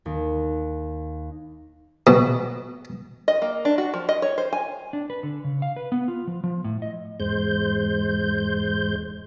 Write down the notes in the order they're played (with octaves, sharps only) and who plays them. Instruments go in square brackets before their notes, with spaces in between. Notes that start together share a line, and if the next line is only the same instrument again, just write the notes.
[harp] D#2
[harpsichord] B2
[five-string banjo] D#5
A#3
D4
F#4
F3
D#5
C#5
C5
G#5
[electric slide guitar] D4
B4
D3
C#3
F5
B4
B3
F4
F3
F3
A2
D#5
[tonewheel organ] E2 G#2 G#3 C5 G6